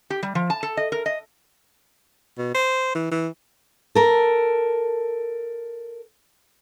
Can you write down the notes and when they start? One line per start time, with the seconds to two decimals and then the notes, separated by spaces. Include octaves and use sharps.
0.10 G4
0.23 G3
0.35 F3
0.50 A5
0.63 A4
0.77 D#5
0.92 A#4
1.06 D#5
2.38 B2
2.55 C5
2.95 E3
3.11 E3
3.95 A4 A#4